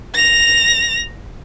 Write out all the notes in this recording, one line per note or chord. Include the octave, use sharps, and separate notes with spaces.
A#6 F7